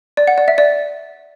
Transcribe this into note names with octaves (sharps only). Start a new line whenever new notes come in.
D5
F#5
D5
E5
D5